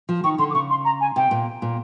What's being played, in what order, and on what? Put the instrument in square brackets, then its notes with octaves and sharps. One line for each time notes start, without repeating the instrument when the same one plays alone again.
[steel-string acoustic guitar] F3
[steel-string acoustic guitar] D#3 [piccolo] C#6
[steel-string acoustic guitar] D3 [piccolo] C6
[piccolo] D6
[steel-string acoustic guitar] C#3 [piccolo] C#6
[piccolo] C6
A#5
G#5
[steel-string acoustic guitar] C3 [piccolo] G5
[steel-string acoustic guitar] A#2
A#2